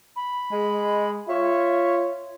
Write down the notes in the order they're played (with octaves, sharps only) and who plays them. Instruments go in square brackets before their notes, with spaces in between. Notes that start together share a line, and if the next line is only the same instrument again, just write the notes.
[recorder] B5
[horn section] G#3
[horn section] F4 C#5 [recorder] E5